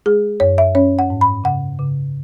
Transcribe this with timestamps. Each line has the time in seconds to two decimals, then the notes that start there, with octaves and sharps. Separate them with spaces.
0.06 G#3 G#4
0.40 F#2 C#5
0.58 E5
0.75 C#4 C#5
0.99 F#5
1.10 G#2
1.21 B5
1.44 C#3 F#5
1.79 C#3